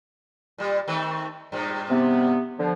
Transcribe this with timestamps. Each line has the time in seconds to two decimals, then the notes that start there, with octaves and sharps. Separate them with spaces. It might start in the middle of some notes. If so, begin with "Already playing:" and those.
0.58 A#2 G3
0.88 D#3 A3 C4
1.52 G2 A#2
1.90 C3 B3
2.59 D3 F3